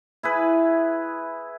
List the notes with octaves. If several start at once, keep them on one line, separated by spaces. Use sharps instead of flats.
E4 G#4 B4